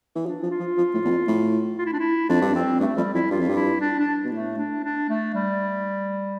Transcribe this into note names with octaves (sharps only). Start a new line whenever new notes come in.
E3
F3 D4
F3
F4
F3
F3
A2
E2
F2
A2
F4
E4
D4
E4
F2 D4
G2
F2 C4
G2 A3
F2 G3
F2 E4
G2 F4
F2
G2
E4
D4
D4
B2
A2 A3
D4
D4
A3
G3